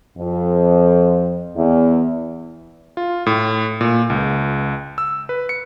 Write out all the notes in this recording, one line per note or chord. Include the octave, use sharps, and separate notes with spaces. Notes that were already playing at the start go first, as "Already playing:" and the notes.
F2
E2
F4
A2
A#2
C#2
E6
B4
C#7